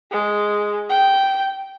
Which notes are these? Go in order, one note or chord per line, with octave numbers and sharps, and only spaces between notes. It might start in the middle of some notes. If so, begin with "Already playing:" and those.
G#3
G5